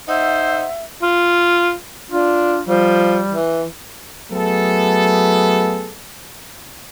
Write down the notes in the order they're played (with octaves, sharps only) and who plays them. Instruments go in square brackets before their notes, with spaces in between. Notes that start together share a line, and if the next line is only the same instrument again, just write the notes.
[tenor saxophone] D#4 [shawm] C5 [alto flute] E5 [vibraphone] F#5 E6
[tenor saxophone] F4
[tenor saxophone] D4 [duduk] F4
[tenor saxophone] F3 [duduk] G3
[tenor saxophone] E3
[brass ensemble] F#3 A3 B3 G#4 A4